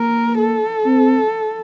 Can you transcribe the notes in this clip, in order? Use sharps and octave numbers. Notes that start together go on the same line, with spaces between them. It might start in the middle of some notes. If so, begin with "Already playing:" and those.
Already playing: A#3 A#4
A4
C4